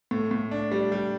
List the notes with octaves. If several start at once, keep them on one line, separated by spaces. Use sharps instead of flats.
A2
A2
D4
G3
G3